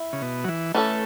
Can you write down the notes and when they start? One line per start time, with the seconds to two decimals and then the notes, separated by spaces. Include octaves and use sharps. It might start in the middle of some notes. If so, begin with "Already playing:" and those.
Already playing: E4 E5
0.13 C#3
0.21 B2
0.44 F#3
0.48 E3
0.74 E3 A3 C#4 A4